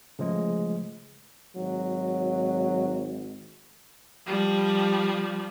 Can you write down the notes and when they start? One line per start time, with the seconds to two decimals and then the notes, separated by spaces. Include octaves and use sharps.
0.19 C#3 F3 G#3 A3
1.56 G#1 F#3
4.26 F3 G3